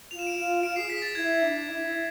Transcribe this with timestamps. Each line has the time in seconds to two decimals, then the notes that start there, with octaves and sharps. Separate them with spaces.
0.11 F4 F7
0.19 E7
0.27 D7
0.35 F4 E7
0.63 F4 D7
0.76 G#4 C7
0.89 G#4 B6
1.02 A6
1.15 E4 G#6
1.42 D4
1.68 E4
1.85 E4